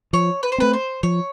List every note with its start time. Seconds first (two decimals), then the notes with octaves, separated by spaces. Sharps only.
0.13 F3 C#5
0.43 B4
0.52 C5
0.58 A3 C4 B4
0.73 C5
1.03 F3 C#5